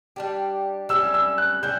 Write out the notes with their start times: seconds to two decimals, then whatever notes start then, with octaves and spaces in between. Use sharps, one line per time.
0.16 G3 D4 G4
0.89 G3 C#4 E4 E6
1.14 E6
1.38 F#6
1.63 G3 C#4 E4 G6